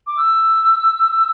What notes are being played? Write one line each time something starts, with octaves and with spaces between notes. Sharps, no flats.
D6
E6